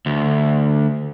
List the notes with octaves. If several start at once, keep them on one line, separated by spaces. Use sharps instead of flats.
D2